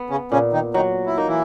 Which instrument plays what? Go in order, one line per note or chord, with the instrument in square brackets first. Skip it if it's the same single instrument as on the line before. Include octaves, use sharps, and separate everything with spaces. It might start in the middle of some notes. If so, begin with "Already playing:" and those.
Already playing: [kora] B3
[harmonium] C#3 C#4
[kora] A#2 [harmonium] C#3 C#4
[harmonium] D#3 D#4
[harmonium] D#3 D#4 [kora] F#3
[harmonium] E4
[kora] A#3 [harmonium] D#4
[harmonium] E3 E4